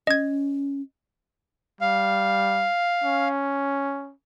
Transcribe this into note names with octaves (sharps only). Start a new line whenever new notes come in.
C#4 D#5 G#6
G3 F5
C#4